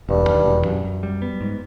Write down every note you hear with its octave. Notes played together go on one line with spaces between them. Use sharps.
E1 G2
D#2
E1
F#2
F#2
G3
B3
G#2